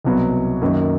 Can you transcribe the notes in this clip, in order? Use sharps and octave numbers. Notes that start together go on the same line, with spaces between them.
C2 B2 F#3 B3
F#2 D#3 F#3 A#3